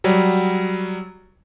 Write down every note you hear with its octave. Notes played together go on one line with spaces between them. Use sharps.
F#3 G3